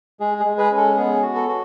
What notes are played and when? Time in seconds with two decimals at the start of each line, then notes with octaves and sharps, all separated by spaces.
0.20 G#3 G#4
0.40 G#4
0.45 G#3
0.58 G#4 B4
0.71 C#4
0.77 A4
0.97 B3 G#4
1.22 F#4
1.35 A4
1.48 F#4